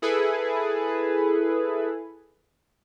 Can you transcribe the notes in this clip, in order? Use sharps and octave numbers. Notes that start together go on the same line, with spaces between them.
E4 G#4 A4 B4